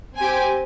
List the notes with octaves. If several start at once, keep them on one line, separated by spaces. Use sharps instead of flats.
C4 G4 G#5